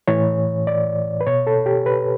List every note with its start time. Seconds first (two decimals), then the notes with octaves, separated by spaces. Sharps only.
0.08 A2 E3 C#5
0.67 D5
1.21 B4
1.27 B2 C#5
1.47 A4
1.66 G4
1.86 B4